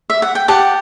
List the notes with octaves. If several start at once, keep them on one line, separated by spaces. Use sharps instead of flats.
E5
F#5
G5
G4 F#5 A5